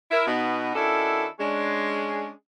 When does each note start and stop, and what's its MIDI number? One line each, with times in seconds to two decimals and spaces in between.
0.11 0.25 64
0.11 0.25 70
0.27 0.74 47
0.27 0.74 59
0.27 0.74 63
0.74 1.25 51
0.74 1.25 61
0.74 1.25 62
0.74 1.25 64
0.74 1.25 66
0.74 1.25 69
1.40 2.29 56
1.40 2.29 61
1.40 2.29 62